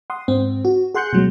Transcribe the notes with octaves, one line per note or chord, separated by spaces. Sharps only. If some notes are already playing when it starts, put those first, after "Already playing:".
F#5 C6 D#6
G#2 C4
F#4
G#4 F#5 C6 F#6 G6 C#7
B2 F#3 G#3